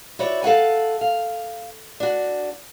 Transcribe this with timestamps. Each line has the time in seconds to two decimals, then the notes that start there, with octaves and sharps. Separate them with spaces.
0.19 E4 F#4 C#5 D5
0.42 A4 F5 F#5 G#5
1.01 F5
2.00 D4 F#4